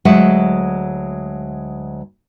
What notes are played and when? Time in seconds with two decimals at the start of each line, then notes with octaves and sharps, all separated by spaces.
0.05 D2 F#3 G#3 E5 F#5